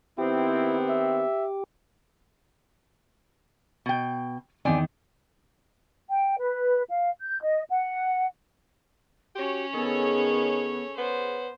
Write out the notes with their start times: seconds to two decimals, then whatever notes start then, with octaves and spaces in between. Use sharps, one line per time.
0.18 D#3 B3 C4 E4 G4
0.89 E5
3.86 B2 G5
4.65 E2 D#3 C4 D5 G#5
6.10 G5
6.39 B4
6.89 F5
7.22 G6
7.42 D#5
7.70 F#5
9.36 C#4 F#4 G4 C#5
9.74 D#3 B3 G#4 A4
10.98 B3 C5 C#5